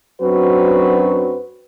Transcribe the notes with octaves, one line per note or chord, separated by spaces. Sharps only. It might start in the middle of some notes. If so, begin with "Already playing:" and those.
F#2 F#3 C4 D4 F#4 B4